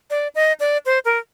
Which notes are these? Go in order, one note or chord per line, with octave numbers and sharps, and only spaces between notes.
D5
D#5
D5
C5
A#4